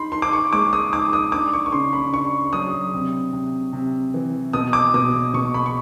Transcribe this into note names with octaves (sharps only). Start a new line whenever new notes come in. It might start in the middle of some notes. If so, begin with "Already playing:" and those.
Already playing: D#4 B5 C6
D#4 C6
D6
C#6
G#3 D6
D#6
D#4 D6
D#6
D4 D6
C#6
C#6
C#3 C6
B5
D4 C#6
F#3 D#6
C3
C3
C3
E3
B2 D#6
D6
B2 D#6
B2 C#6
B5
C#6